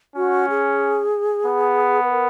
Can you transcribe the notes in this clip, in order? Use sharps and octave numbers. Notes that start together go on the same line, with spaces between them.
C#4 F#4
G#4
B3
B4
A#4